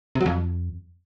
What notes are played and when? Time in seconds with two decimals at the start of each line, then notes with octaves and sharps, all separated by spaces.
0.15 C3
0.21 F#3
0.26 F2